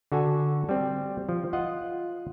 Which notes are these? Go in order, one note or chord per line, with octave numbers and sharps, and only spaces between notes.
D3 F#4 A4 G#5
G3 C4
F3
F4 D#5 F#5